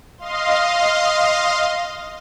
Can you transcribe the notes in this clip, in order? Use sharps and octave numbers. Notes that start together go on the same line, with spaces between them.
D#5 F5 C6